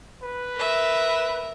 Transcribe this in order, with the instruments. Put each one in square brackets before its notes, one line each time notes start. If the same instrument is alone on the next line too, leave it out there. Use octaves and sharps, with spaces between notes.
[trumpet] B4
[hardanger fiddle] A#4 E5